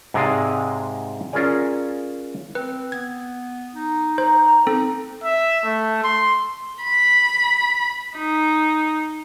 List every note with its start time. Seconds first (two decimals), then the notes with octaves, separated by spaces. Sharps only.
0.14 G#2 C3 G#3 D5 F5 G#5
1.33 C#4 F4 G#4 A#4 D5 G#5
2.55 C4 B4
2.92 B3 G#6
3.75 D#4
4.18 C5 A#5
4.67 C4 D#4 A4
5.24 E5
5.65 A3
6.04 C6
6.83 B5
8.17 D#4